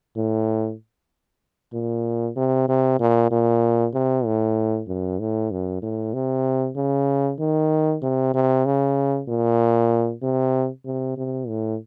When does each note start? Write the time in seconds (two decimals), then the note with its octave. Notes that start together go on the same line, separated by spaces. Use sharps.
0.17 A2
1.73 A#2
2.36 C3
2.68 C3
3.00 A#2
3.31 A#2
3.94 C3
4.25 A2
4.88 F#2
5.19 A2
5.51 F#2
5.82 A2
6.14 C3
6.76 C#3
7.39 D#3
8.02 C3
8.34 C3
8.65 C#3
9.28 A#2
10.23 C3
10.85 C3
11.17 C3
11.48 A2